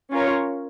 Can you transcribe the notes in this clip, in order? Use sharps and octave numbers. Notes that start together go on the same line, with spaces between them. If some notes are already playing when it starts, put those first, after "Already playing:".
C#4 F4 A#4 C#5